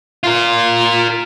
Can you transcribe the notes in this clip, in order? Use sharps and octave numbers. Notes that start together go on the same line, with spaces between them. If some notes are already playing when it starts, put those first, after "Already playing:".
F4 A#4